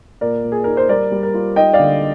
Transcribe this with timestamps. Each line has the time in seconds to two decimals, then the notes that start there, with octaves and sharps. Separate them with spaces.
0.21 A#2 A#4 D5
0.44 A#2
0.52 G#4
0.64 D#4 A#4
0.77 C5
0.89 G3 A#4 D5
1.12 G3
1.23 A#4
1.34 F4
1.56 D#4 D#5 G5
1.73 D5 F5
1.79 D3